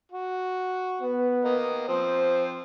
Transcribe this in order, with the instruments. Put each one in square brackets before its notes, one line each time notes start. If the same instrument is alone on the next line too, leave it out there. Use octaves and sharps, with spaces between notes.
[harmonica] F#4
[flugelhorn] B3
[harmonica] A#3 D#5 D#6
[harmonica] F3 C4 [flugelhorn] C5